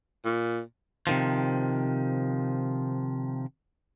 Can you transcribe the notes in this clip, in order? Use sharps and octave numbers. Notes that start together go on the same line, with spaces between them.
A#2
C3 D#3 F3